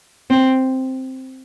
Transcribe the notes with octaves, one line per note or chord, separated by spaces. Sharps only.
C4